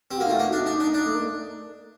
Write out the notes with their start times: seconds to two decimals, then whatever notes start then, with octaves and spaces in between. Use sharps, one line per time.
0.11 C4 G4
0.18 F#4
0.20 A#3
0.26 D#4
0.30 A3 F#4
0.39 A#3
0.52 D4 D#4
0.66 D4
0.80 D4
0.94 D4
1.05 A3
1.15 A#3